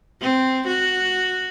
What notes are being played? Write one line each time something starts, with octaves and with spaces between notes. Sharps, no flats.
C4
F#4